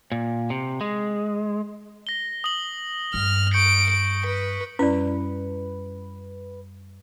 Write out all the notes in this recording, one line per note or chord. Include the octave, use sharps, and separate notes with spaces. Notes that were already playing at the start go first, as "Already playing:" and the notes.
A#2
C3
G#3
A#6 G7
D#6 F#7
G2 F6
C#6 G6 C#7 D7
D7
B4
F#2 G3 C#4 E4 B4 D5